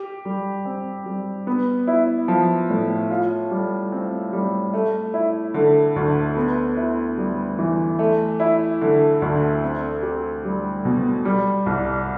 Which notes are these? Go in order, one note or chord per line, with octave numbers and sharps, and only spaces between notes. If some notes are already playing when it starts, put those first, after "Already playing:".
Already playing: G4
G3
C4
G3
B3
E4
F3
A2
F4
G3
C4
G3
A3
E4
D3
D2
B3
E4
G3
E3
A3
E4
D3
D2
C4
G4
G3
B2
G3
C2